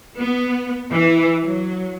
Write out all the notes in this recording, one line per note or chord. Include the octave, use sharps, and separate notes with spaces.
B3
E3
F#3